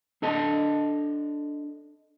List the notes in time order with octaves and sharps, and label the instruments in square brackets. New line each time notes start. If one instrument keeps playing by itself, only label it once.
[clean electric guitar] D4 A4 D#5 A5